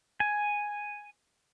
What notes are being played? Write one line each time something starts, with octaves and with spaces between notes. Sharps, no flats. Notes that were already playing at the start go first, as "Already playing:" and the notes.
G#5